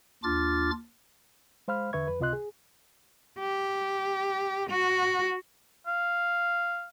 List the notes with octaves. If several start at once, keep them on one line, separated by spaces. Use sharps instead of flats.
D#2 D4 F4 D6 F6 A6
G#3 C5 F5 B5 F6
E2 D3 B4 E5 C#6 G#6
F2 B4
C#2 C3 F4 D#5 C6 F#6
G#4
G4
F#4
F5